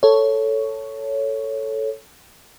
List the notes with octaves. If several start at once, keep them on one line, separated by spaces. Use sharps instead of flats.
A4 C#5